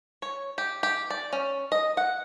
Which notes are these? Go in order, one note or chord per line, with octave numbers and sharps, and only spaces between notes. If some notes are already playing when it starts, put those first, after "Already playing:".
C#5
G4
G4
D5
C#4
D#5
F#5